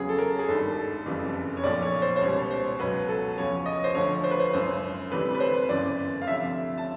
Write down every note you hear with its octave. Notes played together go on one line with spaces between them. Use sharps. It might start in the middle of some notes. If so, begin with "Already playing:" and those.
Already playing: E2 C#3 F#3 G#4
A4
A#4
G#4
G#1 G2 D#3 G3 A4
F#1 F2 C#3 E3 G3
C#5
B1 A#2 F3 D5
C#5
C5
C5
C#2 B2 G3 C#5
C5
C#2 B2 F#3 B4
A4
E2 C#3 F3 C#5
D#5
C5
D2 D3 F3 C#5
C5
B4
C5
G#1 F#2 C#3 C5
D2 C3 E3 G3 B4
B4
C5
G1 F#2 C#3 E3 D5
F5
D2 C3 F3 E5
A5